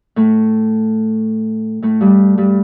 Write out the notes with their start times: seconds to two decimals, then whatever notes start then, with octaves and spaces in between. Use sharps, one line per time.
0.16 A2 A3
1.82 A2 A3
2.01 G2 G3
2.38 G2 G3